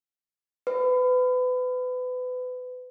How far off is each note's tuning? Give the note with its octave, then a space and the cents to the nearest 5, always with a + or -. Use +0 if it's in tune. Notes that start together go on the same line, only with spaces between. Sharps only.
B4 +30